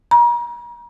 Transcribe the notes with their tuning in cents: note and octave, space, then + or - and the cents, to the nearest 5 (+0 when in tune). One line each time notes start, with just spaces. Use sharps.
A#5 +40